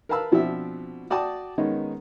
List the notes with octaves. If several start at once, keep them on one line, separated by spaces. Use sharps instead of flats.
A#4 B4 F5 A5 B5 E6
B2 F3 C4 D4 E5
F#4 D5 G5 A5 D#6
D#3 G#3 B3 C#4 D#4